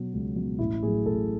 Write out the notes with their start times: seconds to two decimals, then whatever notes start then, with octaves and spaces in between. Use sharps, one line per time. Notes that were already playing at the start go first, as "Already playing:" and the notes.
Already playing: B2 F#3
0.13 C#2
0.36 B2 F#3
0.59 A1 E4
0.83 A2 F#3 G#4
1.05 A1 A4